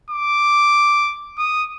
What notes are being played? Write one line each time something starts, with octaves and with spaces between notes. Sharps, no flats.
D6
D#6